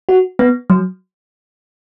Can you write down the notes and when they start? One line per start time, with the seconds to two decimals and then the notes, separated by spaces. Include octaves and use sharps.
0.09 F#4
0.39 B3
0.70 F#3